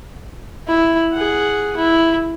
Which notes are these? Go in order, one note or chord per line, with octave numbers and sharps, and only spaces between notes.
E4
G#4 F#5
E4